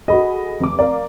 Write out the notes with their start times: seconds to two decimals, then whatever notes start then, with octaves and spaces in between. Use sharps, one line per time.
0.08 F#4 G#4 A4 D#5 B5
0.60 F1 D6
0.79 A#4 D5 F5